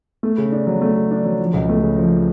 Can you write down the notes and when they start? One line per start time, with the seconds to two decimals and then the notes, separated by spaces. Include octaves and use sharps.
0.23 A3
0.38 C#3
0.52 D4
0.67 F#3
0.82 A3
0.97 C#3
1.11 D4
1.24 F#3
1.40 F3
1.54 C#2
1.69 A3
1.82 C#3
1.98 F3